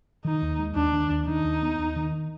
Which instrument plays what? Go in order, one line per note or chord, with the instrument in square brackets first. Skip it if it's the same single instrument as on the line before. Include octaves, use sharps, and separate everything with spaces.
[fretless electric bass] D#3 [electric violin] D#4
[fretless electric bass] D#2
G#3
[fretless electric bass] D#2 [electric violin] D4
[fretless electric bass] D#3
D#2
[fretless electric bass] D#3 [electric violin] D#4
[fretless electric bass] D#2
B3
D#2
D#3